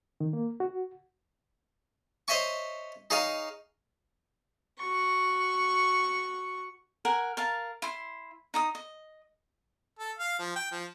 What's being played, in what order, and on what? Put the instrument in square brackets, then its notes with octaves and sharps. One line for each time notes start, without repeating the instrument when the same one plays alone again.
[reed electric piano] D#3
A#3
F#4
[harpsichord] C5 C#5 D#5 E5 G#5 C#6
D#4 G#4 C#5 F5 G#5 A#5
[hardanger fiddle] F#4 C#6
[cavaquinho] A#4 F#5 G#5
A#4 F5 A5
E4 C6
D#4 A#5 D#6
D#5
[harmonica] A4
F5
F3
G5
F3